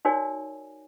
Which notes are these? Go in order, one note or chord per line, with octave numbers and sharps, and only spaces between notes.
D#4 F#4 A#4 C#5 D5 G#5